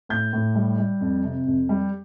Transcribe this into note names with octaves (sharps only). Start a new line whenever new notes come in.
A2 G6
A2
G3
G3
F2
C3
F2
G3